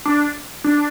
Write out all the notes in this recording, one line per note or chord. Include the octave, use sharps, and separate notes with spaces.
D4
D4